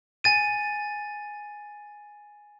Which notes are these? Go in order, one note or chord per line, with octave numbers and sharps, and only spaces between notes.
G#5 A6 D#7